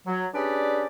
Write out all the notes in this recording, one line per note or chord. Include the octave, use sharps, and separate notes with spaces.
F#3
C#4 D4 G4 G#4 B4 D5